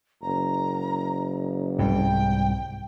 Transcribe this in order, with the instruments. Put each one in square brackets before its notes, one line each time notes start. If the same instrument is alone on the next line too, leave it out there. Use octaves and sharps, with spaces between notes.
[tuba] F#1 [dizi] A#5
[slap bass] C2 G#2 [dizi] G5